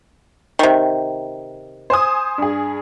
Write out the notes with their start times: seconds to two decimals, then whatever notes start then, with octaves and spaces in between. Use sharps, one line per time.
0.59 C3 D#3
1.90 C5 G#5 D#6
2.38 G2 G#4